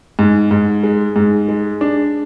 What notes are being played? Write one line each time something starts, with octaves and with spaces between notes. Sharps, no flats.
G#2
G#2
G#3
G#2
G#3
D4